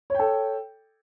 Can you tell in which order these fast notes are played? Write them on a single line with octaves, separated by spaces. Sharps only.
C#5 G5 A4